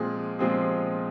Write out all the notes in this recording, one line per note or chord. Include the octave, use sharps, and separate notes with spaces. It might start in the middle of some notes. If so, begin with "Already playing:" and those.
Already playing: A#2 F3 G#3 C4 G#4
A#2 F3 G#3 C4 G#4